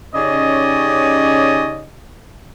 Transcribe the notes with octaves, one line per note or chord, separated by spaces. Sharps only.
C#3 C#4 D#4 G4 D5 D#5